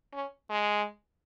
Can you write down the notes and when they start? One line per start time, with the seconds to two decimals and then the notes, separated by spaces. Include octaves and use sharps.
0.13 C#4
0.50 G#3